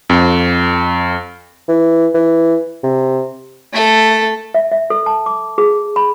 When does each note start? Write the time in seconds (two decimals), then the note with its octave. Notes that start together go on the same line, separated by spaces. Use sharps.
0.10 F2
1.68 E3
2.14 E3
2.84 C3
3.72 A3 A4
4.54 E5
4.72 E5
4.90 A4
5.06 A5
5.26 D6
5.58 G#4
5.96 B5